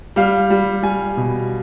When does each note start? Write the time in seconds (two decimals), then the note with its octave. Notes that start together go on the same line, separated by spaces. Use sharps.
0.16 G3 F5
0.50 G3
0.83 G3 G#5
1.17 B2